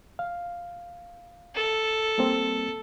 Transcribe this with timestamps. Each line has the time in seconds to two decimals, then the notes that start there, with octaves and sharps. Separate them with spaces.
0.19 F5
1.55 A4
2.18 G3 A#3 C4